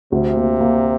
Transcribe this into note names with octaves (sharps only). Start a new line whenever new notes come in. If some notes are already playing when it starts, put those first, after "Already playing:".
D2 C3
A#3
A#3